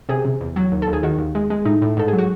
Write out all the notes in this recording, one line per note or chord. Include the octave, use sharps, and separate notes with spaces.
C3 G#4
C3
E2
F#3
D#2
A4
D#2
G#4
D#3 F#4
D#2
G#3
G#3
A2 D#4
A2
G#2 A4
F#3 G#4
F#4